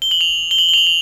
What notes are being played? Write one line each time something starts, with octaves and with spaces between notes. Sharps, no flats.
G7
F#7
F7
G7
F#7
F7 G7
F#7
F7